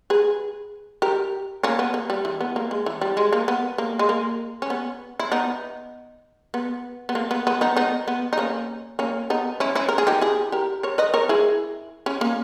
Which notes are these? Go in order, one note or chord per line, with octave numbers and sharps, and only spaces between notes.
G#4 B4
G4 A#4
A#3 C#4
B3
A#3
G3
E3
B3
A#3
G#3
E3
G3
G#3
A#3
B3
A#3
G#3
A#3
C#4
B3
E4
B3 D#4
B3
B3
A#3
B3
B3
B3 D#4
B3 D#4
B3
D#4
A#3 C#4
A#3 C#4
B3 D#4
C#4 E4
C#4 E4
A#4
G#4
D#4 G4
E4 G#4
G4 A#4
A#4 C#5
B4 D#5
A#4 C#5
E4 G#4
C#4 E4
A#3 C#4